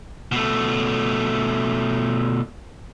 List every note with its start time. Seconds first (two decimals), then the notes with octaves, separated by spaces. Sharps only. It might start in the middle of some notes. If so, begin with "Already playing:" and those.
0.32 B2 A3